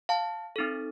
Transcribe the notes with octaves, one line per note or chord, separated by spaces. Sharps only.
F5 A5
C4 D#4 A4